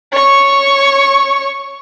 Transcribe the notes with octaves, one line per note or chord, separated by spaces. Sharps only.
C#5 C#6